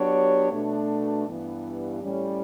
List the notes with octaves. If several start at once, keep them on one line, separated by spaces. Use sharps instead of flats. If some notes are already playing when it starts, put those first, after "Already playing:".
Already playing: F#3 B3 D4 G4 C#5
B2 A3 D4
G2 E3 B3
A2 G3 C#4